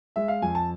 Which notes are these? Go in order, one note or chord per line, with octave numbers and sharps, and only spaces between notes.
G#3 E5
F5
F2 G#5
A5